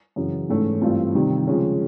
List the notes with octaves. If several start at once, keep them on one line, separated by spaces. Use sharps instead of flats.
F#2 C#3 E3
G#2 E3 A3 C#4
G2 E3 A3 C4 F4
C3 D#3 G3
C#3 F3 G#3 C#4